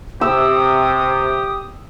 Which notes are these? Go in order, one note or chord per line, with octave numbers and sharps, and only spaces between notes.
C3 G4 D#6 E6